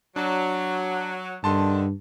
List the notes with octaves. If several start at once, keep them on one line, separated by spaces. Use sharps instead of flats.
F#3 D4
G2 D3 D#3 A5 C6